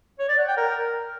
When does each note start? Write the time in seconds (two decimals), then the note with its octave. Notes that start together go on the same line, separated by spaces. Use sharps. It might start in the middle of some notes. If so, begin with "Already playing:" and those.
0.19 C#5
0.29 D5
0.38 F#5
0.48 G5
0.57 A#4